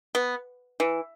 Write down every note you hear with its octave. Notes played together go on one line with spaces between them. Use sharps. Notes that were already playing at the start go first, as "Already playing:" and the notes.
B3
E3